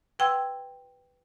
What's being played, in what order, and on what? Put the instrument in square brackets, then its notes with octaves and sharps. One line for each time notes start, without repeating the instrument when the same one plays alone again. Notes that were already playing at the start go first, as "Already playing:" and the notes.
[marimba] B4 F#5 G5 C6 E6 G#6